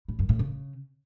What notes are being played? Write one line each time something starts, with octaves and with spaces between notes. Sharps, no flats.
A2
F#2
A2
C#3